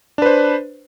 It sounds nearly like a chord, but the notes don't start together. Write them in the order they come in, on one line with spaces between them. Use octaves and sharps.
D4 B4 C5